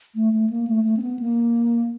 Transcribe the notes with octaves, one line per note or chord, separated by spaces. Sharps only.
A3
A3
A#3
A3
A3
C4
B3
A#3